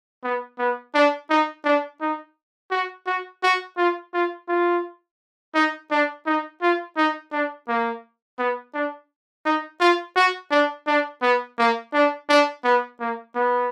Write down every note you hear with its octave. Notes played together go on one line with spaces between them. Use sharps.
B3
B3
D4
D#4
D4
D#4
F#4
F#4
F#4
F4
F4
F4
D#4
D4
D#4
F4
D#4
D4
A#3
B3
D4
D#4
F4
F#4
D4
D4
B3
A#3
D4
D4
B3
A#3
B3